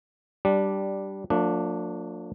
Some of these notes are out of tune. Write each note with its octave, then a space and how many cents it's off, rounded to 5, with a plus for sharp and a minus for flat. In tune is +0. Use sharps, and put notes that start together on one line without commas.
G3 -10 D4 +0
F3 +40 A#3 -40 D4 +0